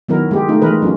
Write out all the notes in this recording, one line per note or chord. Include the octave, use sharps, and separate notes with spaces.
D#3 F#3 B3 E4 A#4
G#3 G4
A3 D#4 F4
E3 G#3 A#4 B4
F#3 C#4 F4